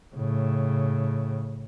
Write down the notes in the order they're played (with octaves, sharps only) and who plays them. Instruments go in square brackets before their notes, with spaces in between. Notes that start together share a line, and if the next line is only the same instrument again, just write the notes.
[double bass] A2 C#3